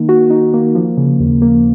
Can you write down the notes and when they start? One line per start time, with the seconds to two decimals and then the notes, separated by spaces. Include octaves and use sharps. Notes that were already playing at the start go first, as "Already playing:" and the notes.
Already playing: D#3 A#3 D#4
0.09 F#4
0.30 D#4
0.54 A#3
0.75 F3
0.97 C#3
1.20 D#2
1.42 A#3